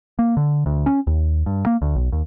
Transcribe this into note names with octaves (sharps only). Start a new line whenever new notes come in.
A#3
D3
D2
C#4
D#2
G2
A#3
D2
B1
D#2